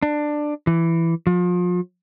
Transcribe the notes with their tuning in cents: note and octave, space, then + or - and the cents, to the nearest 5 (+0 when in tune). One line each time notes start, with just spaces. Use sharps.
D4 +15
E3 +10
F3 +35